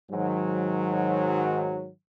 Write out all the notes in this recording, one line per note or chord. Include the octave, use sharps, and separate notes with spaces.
G#2 D#3 F#3